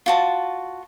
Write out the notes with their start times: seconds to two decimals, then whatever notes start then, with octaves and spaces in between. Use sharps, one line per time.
0.06 F4 F#4 A5